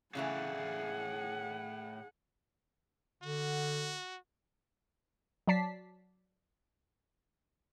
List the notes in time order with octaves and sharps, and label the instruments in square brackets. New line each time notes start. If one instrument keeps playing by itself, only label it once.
[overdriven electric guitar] A2 F5 [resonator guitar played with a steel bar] C#3 E3 A3 [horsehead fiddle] G#4 F#5
[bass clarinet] D3 [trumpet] F#4
[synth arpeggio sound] F#3 D5 A5 B6 C7